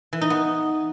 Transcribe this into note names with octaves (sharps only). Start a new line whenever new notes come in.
E3
D#4
B3